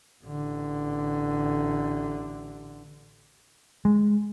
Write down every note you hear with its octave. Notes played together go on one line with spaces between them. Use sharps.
A1 D3
G#3